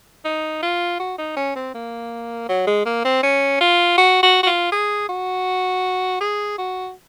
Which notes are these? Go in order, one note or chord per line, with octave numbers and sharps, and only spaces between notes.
D#4
F4
F#4
D#4
C#4
C4
A#3
F#3
G#3
A#3
C4
C#4
F4
F#4
F#4
F#4
F4
G#4
F#4
G#4
F#4